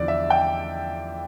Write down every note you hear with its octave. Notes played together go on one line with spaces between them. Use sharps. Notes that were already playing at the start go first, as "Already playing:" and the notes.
Already playing: E2 D3 F3 D5
E5
G5